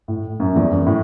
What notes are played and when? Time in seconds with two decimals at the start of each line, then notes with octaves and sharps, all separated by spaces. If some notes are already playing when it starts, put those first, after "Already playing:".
0.08 A2
0.40 F#2
0.56 E2
0.71 F#2
0.86 A2